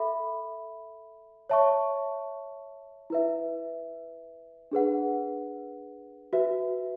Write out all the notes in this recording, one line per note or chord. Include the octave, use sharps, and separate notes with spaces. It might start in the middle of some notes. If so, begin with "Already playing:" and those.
Already playing: A4 E5 B5
C#5 E5 A5 C#6
E4 B4 E5
D4 G#4 B4 F#5
F#4 B4 E5